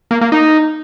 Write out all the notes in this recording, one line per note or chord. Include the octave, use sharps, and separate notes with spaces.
A#3
A#3
D#4